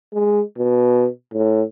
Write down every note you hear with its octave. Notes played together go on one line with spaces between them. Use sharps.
G#3
B2
A2